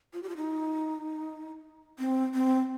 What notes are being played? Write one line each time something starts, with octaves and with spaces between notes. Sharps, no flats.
F4
G4
F4
D#4
C4
C4